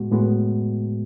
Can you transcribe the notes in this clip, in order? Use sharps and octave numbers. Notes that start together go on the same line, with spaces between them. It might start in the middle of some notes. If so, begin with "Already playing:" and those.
Already playing: A2 G#3 B3 F#4
A2 G#3 B3 F#4